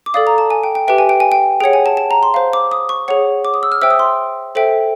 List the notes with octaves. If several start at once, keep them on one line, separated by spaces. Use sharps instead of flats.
D6
A4 D5 F5 D#6
A#5
A5
G#5
G5
G5
G4 B4 E5 G5
G#5
G5
G#5
G5
G#4 C#5 F#5 G5
G#5
A5
A5
A#5
C6
C5 F5
D6
D#6
C#6
G#4 C#5 F#5
D6
D#6
E6
F6
C5 E5 G5 E6
D#6
C6
A4 C5 E5 G5